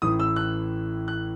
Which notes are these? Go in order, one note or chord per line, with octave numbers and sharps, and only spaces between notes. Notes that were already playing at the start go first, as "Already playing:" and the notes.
A1 A2 E3 D#6
E6
F#6
F#6